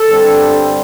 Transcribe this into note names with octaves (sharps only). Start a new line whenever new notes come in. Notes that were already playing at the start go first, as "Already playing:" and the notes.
Already playing: A4
G2 D3 G3 C4